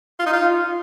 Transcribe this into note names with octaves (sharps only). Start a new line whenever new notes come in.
F4
D#4
F4